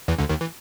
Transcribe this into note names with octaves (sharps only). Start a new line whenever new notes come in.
E2 E3
D2 D3
D#2 D#3
E3